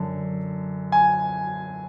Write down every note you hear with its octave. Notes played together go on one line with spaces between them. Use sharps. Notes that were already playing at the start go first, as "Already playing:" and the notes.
Already playing: F#2 D3
G#5